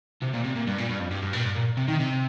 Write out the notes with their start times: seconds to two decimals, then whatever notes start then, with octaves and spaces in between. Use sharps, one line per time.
0.22 C3
0.33 A#2
0.44 C3
0.55 A#2
0.67 G2
0.78 A#2
0.89 G2
0.99 F2
1.11 G2
1.22 G2
1.33 A#2
1.43 G2
1.55 A#2
1.77 C3
1.88 D#3
2.00 C3